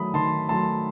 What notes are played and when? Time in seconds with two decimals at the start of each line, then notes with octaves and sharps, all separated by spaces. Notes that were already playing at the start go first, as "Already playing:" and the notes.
Already playing: D#3 F#3 A3 B5 D#6
0.14 D#3 A5 C6
0.49 F#3 A3 A5 C6